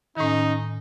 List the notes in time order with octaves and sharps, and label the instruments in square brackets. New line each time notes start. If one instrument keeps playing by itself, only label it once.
[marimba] A2 D#3 [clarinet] C#4 [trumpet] D#4